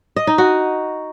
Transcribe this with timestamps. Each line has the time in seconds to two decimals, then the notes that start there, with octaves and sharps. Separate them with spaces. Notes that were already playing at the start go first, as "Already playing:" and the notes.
0.16 D#5
0.27 D#4
0.38 F#4